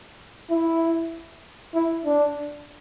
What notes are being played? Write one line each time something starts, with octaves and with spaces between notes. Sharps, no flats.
E4
E4
D4